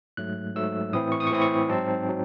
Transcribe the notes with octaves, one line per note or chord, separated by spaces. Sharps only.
G#2 F#3 A3 F#6
G#2 F#3 A3 E6
A2 E3 C4 E4 D#6
C#6
D#6
C#6
A2 E3 C4 E4 D#6
C#6
G#2 F#3 C4 D#4 A5
F#3 C4